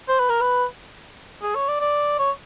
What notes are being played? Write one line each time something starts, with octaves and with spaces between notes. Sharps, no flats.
C5
B4
A#4
B4
G#4
C#5
D5
D5
C#5